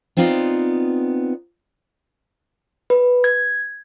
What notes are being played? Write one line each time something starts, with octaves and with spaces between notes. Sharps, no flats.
B3 C4 D#4 F4 D5
B4
G#6